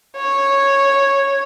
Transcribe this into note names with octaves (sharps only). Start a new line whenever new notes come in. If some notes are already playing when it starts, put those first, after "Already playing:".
C#5